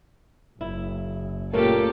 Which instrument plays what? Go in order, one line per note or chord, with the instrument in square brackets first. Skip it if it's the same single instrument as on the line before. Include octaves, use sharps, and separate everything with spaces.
[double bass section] F#1 [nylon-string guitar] E4
[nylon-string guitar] A#2 C#3 [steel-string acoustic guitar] A3 A#4 C#5 [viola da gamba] A#3 G4 A4